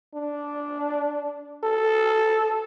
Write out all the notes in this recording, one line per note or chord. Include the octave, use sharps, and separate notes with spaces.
D4
A4